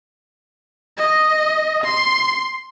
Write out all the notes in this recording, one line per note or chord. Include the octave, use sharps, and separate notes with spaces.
D#5
C6